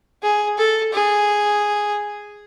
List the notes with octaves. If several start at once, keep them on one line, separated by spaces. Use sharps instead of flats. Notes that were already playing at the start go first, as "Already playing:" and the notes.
G#4
A4
G#4